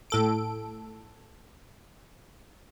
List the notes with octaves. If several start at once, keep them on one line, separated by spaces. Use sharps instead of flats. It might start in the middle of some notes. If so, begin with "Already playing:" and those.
A2 A4 D7